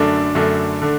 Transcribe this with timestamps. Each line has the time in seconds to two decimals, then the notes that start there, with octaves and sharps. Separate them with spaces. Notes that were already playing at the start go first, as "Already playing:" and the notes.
Already playing: F#2 D3 A3 D4
0.35 F#2 D3 A3 D4
0.82 D3 A3 D4